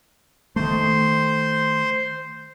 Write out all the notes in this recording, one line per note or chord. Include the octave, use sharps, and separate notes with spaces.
D#3 A3 C5 C6